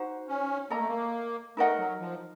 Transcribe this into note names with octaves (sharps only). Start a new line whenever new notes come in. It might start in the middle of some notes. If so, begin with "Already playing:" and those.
Already playing: D#4 F#4 C5 F#5
C#4
A#3 A4 D#5 A#5
A3
A#3
A3 D#4 A#4 D#5 F#5
F#3
F3